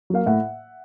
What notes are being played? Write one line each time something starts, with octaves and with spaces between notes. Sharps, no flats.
F#3 A#3 F5
A2 E5 F#5